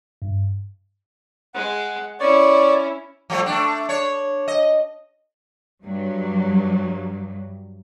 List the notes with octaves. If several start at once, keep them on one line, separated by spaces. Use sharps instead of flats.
G2
G#3 F#5
C#4 E4 C#5 D5
F3 G3 A3
A3 D4
D4 C#5
D#5
G2 F#3